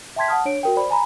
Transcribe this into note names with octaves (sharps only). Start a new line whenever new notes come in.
E5 G5 A5 C6 G#6 B6
F#5 A5 D#6 F6
D4 C#5 D7
F#4 A#4 G5
C5 D5 B5
G#5 A#5 B5